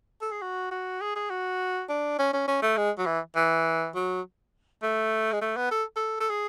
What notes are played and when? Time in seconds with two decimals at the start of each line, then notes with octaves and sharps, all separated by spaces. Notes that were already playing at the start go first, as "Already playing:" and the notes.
0.22 A4
0.32 G#4
0.42 F#4
0.71 F#4
1.01 G#4
1.16 G#4
1.30 F#4
1.89 D4
2.19 C#4
2.33 C#4
2.48 C#4
2.62 A3
2.77 G#3
2.98 F#3
3.06 E3
3.36 E3
3.95 F#3
4.83 A3
5.33 G#3
5.41 A3
5.57 B3
5.71 A4
5.96 A4
6.20 A4
6.30 G#4